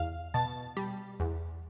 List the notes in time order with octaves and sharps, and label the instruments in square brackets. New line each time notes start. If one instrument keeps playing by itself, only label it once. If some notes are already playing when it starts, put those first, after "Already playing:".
Already playing: [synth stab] E2 F5
B2 A5
G3
E2